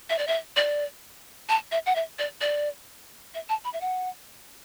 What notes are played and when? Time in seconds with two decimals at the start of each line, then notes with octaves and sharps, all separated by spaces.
0.10 E5
0.18 D5
0.27 E5
0.56 D5
1.49 A5
1.71 E5
1.86 F#5
1.95 E5
2.19 D5
2.41 D5
3.34 E5
3.49 A5
3.64 B5
3.73 E5
3.81 F#5